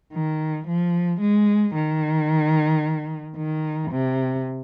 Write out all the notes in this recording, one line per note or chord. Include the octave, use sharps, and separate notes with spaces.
D#3
F3
G#3
D#3
D#3
C3